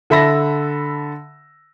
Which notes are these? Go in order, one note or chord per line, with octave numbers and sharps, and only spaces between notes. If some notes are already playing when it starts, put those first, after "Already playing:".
D3 A4 E5 B5 E6 A#6